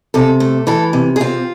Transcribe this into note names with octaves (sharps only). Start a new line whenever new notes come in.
C3 A4
A3
E3 A4
C3
G#4
C4 F4